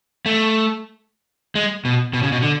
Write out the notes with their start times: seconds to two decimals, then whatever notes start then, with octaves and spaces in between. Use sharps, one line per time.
0.26 A3
1.55 G#3
1.85 B2
2.13 B2
2.23 C#3
2.32 B2
2.43 D3